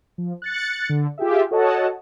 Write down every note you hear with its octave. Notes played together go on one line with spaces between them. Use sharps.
F3
F#6 A6 C#7
D3
F4 G4 G#4 E5
F#4 A4 C#5 D#5 F#5 A5